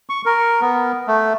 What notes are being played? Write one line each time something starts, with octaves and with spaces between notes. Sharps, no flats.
C#6
A#4
B3
A3